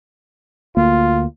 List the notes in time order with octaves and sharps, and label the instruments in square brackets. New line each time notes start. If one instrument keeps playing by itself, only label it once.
[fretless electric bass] D2 A#3 [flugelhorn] F4